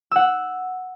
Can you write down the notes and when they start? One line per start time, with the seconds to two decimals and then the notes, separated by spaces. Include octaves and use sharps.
0.11 F#5 E6